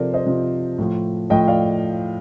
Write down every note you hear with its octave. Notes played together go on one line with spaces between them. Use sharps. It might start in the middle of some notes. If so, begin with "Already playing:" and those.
Already playing: C3 F3 A4 A#4 C5 D5
C5 D#5
C3 F3
A2 F3
A2 F3 D#5 G5
D5 F5